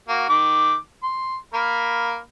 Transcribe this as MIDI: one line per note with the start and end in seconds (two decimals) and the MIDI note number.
0.08 0.28 58
0.08 0.28 66
0.29 0.76 51
0.29 0.76 86
1.03 1.37 84
1.54 2.19 58
1.54 2.19 70
1.54 2.19 83